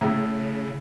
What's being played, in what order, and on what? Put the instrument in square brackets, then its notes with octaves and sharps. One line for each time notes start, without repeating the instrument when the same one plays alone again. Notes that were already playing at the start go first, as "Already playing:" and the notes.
[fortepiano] A2 [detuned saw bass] C#3